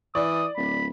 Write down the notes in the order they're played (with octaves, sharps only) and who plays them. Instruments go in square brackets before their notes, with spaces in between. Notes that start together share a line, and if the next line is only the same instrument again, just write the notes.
[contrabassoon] E3 [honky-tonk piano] D5 [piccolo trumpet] D#6
[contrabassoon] D1 [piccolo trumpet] B5